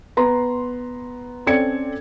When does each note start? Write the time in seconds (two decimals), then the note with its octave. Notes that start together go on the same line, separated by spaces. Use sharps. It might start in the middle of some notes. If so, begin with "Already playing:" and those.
0.17 B3 A#5 C6
1.47 C4 C#4 A4 D5 G#6 C#7